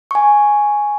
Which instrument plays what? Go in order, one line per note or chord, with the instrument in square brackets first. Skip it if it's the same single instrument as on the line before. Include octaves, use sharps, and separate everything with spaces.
[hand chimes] G#5 C#6